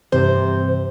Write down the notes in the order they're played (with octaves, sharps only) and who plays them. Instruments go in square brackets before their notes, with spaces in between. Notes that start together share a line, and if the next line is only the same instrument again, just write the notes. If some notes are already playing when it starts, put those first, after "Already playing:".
[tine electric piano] G2 E3 [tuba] C3 [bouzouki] C5